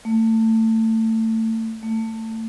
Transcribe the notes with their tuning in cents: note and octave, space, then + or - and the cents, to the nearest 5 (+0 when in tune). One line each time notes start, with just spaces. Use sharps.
A3 +25
A3 +20